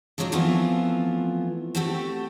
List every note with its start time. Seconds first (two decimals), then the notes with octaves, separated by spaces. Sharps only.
0.18 F3 F#3 G#3 C4 D4
0.32 E3 F3 A3 B3 C4 F4
1.75 A3 C4 F#4 G4 A4